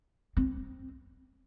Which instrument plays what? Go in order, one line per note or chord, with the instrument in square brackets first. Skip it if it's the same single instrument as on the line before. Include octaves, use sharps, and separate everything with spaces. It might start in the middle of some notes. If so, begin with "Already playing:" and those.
[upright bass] C4